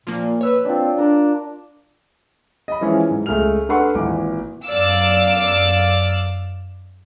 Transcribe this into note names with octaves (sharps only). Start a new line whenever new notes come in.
A#2 F3 A#3
B4 C#5 E6
C4 D4 F4
D4 A#4 A#5 C6
D#5 B5
E3 F3 G#3 C#4 E4 F4
G#2
C#2 A3 G#4 F6 F7
D4 A4 B4 F#5 C6 C#6
G#1 A#2 E3 D6
F#2 D5 F5 D6 E6